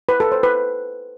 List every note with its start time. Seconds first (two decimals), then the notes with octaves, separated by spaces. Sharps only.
0.09 B4
0.20 A4
0.32 C5
0.43 B4